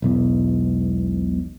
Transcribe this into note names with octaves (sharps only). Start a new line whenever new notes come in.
E1 B1 E2